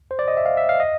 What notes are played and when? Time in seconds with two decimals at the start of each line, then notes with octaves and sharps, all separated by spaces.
0.11 C5
0.19 D5
0.28 D#5
0.37 E5
0.46 F5
0.57 E5
0.69 F5
0.80 D#5